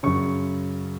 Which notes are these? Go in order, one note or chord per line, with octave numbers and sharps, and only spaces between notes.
F#2 C#3 C#6